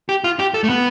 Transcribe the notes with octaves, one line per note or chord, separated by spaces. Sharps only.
G4
F4
G4
A4
A3
B3